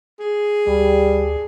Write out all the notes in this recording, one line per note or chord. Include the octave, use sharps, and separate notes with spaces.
G#4
D2 G3